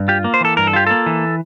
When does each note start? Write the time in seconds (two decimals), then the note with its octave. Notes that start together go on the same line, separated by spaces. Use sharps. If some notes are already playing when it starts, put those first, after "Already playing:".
Already playing: G2
0.08 F4 G4
0.24 A#3
0.34 C5
0.41 E3 A4
0.57 G2 A#4
0.67 A4
0.73 F4 G4
0.87 A#3 A4
1.06 E3